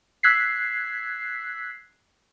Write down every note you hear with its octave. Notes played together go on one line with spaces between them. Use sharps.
E6 F#6 G#6 B6 C7